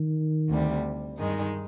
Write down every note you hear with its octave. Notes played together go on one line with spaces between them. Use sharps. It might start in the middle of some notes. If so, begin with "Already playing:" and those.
Already playing: D#3
D2 C3 G3
G2 D#3 G#3 D#4